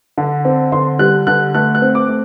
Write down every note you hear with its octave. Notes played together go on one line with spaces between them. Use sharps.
D3
C4
D3 C6
G3 F#6
D3 F#6
A3 F#6
F#6
C4
D6
A3